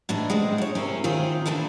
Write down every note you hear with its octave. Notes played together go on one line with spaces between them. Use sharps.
A2 E3 D4 D#4
G#3 B3 C4
D4 C#5
C3 C4 C#4 E4 A#4
D#3 C4 F4 G#4
A#2 E3 A3 D4 E4